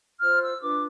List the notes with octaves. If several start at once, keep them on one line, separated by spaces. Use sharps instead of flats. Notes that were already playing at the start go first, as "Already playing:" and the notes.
F4 C5 F6
E6
D4 F4 B4 D6